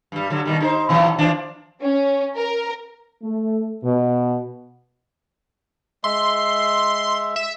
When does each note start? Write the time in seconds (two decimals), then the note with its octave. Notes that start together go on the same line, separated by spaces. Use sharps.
0.12 G2 G3
0.30 D3 F#3
0.45 B2 D#3 G3
0.60 D#4 A#4 C5
0.89 B2 E3 F#3
1.18 E3 F3 D4
1.80 C#4
2.36 A#4
3.23 A3
3.84 B2
6.04 G#3 E5 C6
7.36 E5